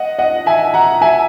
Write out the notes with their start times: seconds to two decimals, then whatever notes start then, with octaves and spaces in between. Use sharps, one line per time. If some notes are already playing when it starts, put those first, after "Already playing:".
Already playing: D#5 F#5
0.19 D#5 F#5
0.46 E5 G#5
0.74 F#5 A#5
1.02 E5 G#5